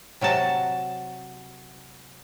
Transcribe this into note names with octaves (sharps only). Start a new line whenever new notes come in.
C3 F#3 F#4 A5